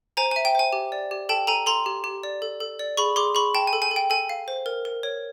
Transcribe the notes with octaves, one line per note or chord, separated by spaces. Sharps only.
C5 G#5 A#5
E5 G#5
G5
C5 G#5
G4
D5
G4
A4 G5 A5
A4 G#5 A#5
A4 A#5 C6
G4
G4
D5
A4
A4
D5
G#4 B5 C#6
G#4 C6 D6
G#4 B5 C#6
G5 A5
G#5
A4
G#5
A4
G5
A4 G#5
F5
C5
A#4
A#4
C#5